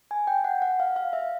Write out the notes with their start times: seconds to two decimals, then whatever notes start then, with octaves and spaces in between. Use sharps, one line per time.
0.11 G#5
0.27 G5
0.44 F#5
0.62 F#5
0.80 F5
0.96 F5
1.13 E5